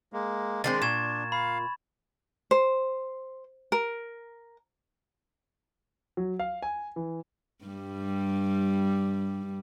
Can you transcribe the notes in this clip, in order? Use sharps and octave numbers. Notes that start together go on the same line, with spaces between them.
G#3 A#3
D#3 G#3 C4 D4 A6
A#2 C#6 G#6 E7
F5 B5
C5
A#4
F#3
F5
G#5
E3
G2 G3